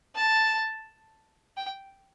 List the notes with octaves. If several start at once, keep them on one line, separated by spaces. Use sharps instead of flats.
A5
G5